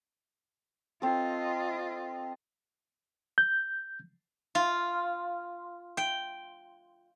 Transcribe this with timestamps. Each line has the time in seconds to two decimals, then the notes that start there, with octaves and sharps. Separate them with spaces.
1.02 C4 F4 A4 D#5
3.38 G6
4.55 F4
5.97 G5